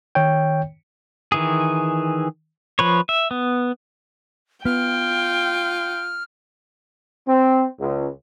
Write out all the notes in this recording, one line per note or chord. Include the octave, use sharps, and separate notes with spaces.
D#3 C#5 G5
D#3 E3 G#4
F3 B4 C#5
E5
B3
B3 F4 G5 F6
C4
C#2